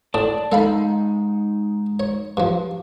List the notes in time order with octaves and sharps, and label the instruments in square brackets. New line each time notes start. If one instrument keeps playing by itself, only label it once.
[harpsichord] A2 D#6 [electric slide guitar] D5 A5
[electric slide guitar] G#3 D#4 [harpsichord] A4 F5 B5
[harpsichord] C#5
G2 F3